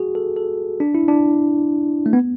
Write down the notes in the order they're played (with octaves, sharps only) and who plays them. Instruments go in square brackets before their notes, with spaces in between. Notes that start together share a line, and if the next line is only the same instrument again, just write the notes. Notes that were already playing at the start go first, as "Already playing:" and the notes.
Already playing: [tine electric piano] F#4 G#4
A4
A4
D4
E4
D4
A3
B3